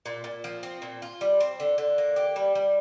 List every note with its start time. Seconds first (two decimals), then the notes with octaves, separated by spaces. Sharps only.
0.06 A#2
0.24 A#2
0.44 F3
0.63 C4
0.82 A#2
1.02 F4
1.21 G3
1.40 C4
1.60 D3
1.78 D3
1.98 A#3
2.16 G4
2.36 G3
2.55 G3